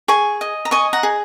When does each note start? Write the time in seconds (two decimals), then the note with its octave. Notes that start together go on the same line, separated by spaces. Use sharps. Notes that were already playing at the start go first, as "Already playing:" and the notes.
0.08 G#4 G#5 C#6
0.41 D#5
0.65 A#5
0.71 D#5 G#5 C#6
0.93 F#5 A#5
1.03 G#4